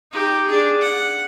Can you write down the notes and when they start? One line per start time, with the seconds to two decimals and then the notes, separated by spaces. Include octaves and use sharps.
0.12 D#4 G4
0.47 D4 G#4
0.82 F#5